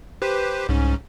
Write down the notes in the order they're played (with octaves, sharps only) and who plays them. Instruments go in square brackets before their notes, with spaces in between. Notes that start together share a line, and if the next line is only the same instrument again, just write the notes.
[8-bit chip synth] G4 B4 C5
[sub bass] C2 [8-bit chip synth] G#2 C#4